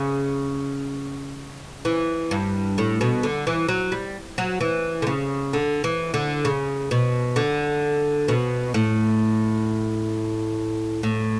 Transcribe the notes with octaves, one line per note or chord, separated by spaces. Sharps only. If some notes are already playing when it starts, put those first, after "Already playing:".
Already playing: C#3
E3
G2
A2
B2
D3
E3
F#3
G3
F#3
E3
D3
C#3
D3
E3
D3
C#3
B2
D3
B2
A2
A2